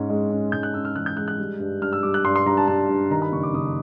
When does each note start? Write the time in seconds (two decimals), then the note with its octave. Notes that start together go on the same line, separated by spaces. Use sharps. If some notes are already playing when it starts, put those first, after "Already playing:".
Already playing: G#2 C#4
0.09 G#3
0.31 C#4
0.52 G#2 G6
0.63 F#6
0.74 C#4 E6
0.85 F6
0.96 E3 F#6
1.06 G6
1.17 G#3 F#6
1.28 F#6
1.39 G3
1.60 G2
1.82 G2 F6
1.93 E6
2.03 G3 D6
2.14 F#6
2.25 G2 C6
2.36 C6
2.46 G2 A#5
2.57 A5
2.68 G2 A5
2.89 G2
3.11 D#3 A#5
3.22 B5
3.32 F#1 C#6
3.43 D6
3.54 F#1 D#6